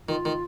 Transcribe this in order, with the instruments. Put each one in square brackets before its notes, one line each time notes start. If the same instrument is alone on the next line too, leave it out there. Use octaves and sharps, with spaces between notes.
[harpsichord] D#3 [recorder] F4
[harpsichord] D#3